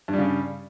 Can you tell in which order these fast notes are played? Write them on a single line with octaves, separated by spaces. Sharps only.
G2 G3 C#3